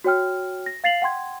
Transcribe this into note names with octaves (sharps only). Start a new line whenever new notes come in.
F#4 C#5 G5 F6
A#6
F5 A6 C7 F7 F#7
F#5 G5 C6 G#6